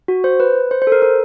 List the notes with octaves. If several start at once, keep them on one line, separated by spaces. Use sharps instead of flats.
F#4
C5
B4
C5
C5
A4
A#4
A#4